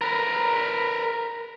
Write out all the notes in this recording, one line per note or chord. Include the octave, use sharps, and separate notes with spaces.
A#4 B4